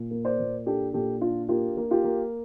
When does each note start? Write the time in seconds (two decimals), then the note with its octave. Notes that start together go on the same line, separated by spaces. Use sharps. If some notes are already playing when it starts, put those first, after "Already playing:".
Already playing: A#2
0.11 A#3
0.25 C5 D5
0.39 A#2
0.67 D4 G4 A4
0.94 A#2 G4 A4
1.21 D4 F4
1.49 A#3 F4 G4
1.77 A#3
1.91 F4 G4
2.04 A#3